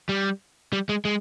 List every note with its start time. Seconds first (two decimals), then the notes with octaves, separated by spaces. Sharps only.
0.09 G3
0.73 G3
0.89 G#3
1.05 G#3